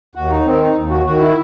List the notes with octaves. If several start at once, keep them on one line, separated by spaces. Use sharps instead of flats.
D#2 F#4
D#4
D#3 C4
D#4
D#2
F#4
D#3 F#4
E4